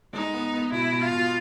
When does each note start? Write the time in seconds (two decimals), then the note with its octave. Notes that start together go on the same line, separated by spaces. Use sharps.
0.13 G#3 D#4
0.33 B3
0.53 B3
0.72 B2 E4
0.92 B2
1.02 F4
1.11 B2